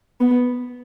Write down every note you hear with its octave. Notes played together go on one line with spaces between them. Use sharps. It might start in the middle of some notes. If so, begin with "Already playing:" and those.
B3